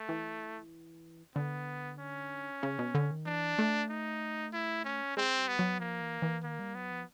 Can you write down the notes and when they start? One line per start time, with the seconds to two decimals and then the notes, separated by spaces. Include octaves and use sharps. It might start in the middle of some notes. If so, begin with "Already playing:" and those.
Already playing: A3
0.09 E3
1.36 D3 B3
1.99 C#4
2.63 C#3
2.79 B2
2.95 D3
3.11 D#3
3.26 E3 D4
3.59 A3
3.90 D#4
4.53 E4
4.85 C#4
5.17 G#3 C4
5.38 G3
5.48 B3
5.59 F#3
5.80 F3 A#3
6.01 E3
6.22 E3
6.44 D#3 A#3
6.59 G3
6.75 F#3 B3
6.91 F3